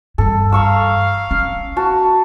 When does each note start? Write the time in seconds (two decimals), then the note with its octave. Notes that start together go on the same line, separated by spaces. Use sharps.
0.18 G2 E3 A4
0.52 F5 A#5 C#6 E6
1.31 C#4
1.76 F#4 A5